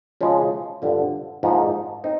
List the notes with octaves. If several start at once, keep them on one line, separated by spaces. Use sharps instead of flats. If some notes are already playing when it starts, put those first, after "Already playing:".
C#3 F3 G#3
G2 D3 F3
G#2 F3 A#3 D#4
C4 D#4